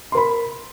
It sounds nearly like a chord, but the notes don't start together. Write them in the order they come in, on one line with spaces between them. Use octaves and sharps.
C6 A#4 B5